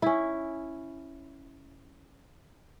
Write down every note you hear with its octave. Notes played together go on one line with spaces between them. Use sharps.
C#4 E4